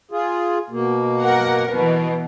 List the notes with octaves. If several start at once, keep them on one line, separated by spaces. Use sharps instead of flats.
F4 G#4
B2 A#3
A#4 F#5
B2 E3